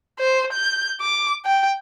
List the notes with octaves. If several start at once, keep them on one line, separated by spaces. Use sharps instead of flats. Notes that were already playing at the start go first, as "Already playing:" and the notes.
C5
G6
D6
G5